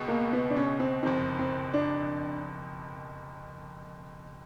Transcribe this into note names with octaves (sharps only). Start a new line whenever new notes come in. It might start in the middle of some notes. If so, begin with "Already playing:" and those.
Already playing: C#2 B2 G#3
A#3
B3
D4
C#4
C4
F#1 F2 C3 D#3 C4
C4
D4